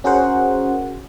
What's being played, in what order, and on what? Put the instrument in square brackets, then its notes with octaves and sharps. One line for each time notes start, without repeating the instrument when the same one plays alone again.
[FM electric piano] C#4 F#4 G#4 A#4 C5 F#5